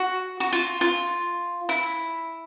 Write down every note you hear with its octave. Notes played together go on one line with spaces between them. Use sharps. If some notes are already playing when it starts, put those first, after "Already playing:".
Already playing: F#4
F#4
F4
F4
E4